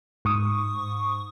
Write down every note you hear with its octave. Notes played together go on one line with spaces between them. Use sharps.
G#2 C#6 D#6